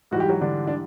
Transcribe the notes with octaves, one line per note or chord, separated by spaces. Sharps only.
G#2 E3 G3 F#4
G4
F#3 F#4
D3 D4
D4